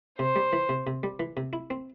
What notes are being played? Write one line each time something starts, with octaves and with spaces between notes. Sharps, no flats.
C3 C5
G3
E3
C3
C3
G3
E3
C3
E4
C4